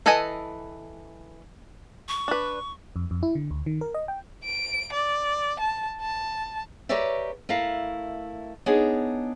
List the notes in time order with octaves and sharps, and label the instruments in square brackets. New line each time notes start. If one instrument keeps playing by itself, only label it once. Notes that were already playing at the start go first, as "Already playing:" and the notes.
[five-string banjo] E3 A4 B4 D#5 G#5
[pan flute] C#6
[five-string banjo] D4 B4
[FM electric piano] F2
F2
E4
D3
D2
D#3
A#4
D#5
G5
[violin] D7
D5
A5
A5
[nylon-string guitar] G4 A#4 B4 C#5 D5 E5
A3 E4 A#4 F5
B3 D4 D#4 G#4 C#5